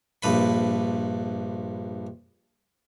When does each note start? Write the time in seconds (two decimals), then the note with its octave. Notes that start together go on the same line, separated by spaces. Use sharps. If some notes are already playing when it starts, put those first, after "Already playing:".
0.23 A#1 G2 B4 B5